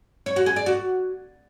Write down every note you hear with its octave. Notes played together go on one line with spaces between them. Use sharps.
C#5
F#4
G#4
D5
F#4